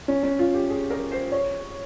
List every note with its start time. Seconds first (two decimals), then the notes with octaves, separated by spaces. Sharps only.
0.08 C#4
0.23 C#4
0.39 F4
0.54 G4
0.70 G#4
0.91 A#4
1.12 C5
1.32 C#5